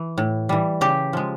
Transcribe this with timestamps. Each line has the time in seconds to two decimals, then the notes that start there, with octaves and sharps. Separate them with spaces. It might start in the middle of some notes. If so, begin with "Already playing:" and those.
Already playing: E3
0.18 A2
0.49 E3 G3
0.81 C#3 G4
1.13 F3 G#3